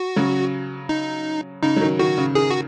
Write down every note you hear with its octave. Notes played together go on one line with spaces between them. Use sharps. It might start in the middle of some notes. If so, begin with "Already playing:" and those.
Already playing: F#4
C#3 F#3
D#4
C#3 D#4
F#3
D#3
D#3 F#4
C#3
D#3 G#4
F#4